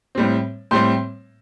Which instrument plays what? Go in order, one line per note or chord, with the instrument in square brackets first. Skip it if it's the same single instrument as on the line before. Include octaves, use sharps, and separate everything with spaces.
[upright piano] A2 G3 C4
A2 G3 C4 C6